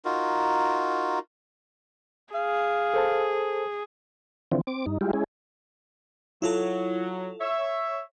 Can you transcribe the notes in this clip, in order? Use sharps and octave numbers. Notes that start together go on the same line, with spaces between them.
D#4 F4 F#4 A#4
G#4 F5
A4 C5 A5
D3 E3 F3 C4
C4 D6
G2 D#4
G3 G#3 E4 F4 G4
G#3 C#4 E4 G#4
F#3 E4 F4 A4
C#5 E5